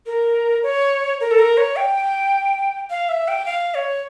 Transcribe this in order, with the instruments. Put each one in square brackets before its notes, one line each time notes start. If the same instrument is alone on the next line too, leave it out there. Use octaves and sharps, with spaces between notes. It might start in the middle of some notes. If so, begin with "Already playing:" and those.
[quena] A#4
C#5
A#4
A4
A#4
C#5
G5
F5
E5
G5
F5
C#5